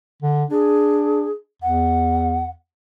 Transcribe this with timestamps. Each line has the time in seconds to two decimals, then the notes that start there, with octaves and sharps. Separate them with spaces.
0.23 D3
0.51 D4 G#4
1.62 E2 F#5